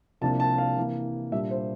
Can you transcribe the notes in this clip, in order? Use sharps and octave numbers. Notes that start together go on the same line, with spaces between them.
C2 C3 F3 A#3 D4 A5
A5
F5
C3 E3 A#3
A#2 G3 D4 E5
C5